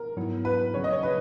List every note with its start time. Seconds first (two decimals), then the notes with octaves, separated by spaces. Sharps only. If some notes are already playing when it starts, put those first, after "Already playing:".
Already playing: A#4
0.17 G#2 F#3 B3 E4
0.45 B4
0.74 C#3 F#3 C#4 G#4 C#5
0.84 D#5
0.92 C#5
1.03 B4